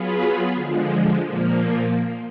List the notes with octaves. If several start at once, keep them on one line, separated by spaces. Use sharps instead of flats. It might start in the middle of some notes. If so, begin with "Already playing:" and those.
Already playing: F#3 B3 F4 G#4 B4
D3 F3 G#3
A#2 F3 A#3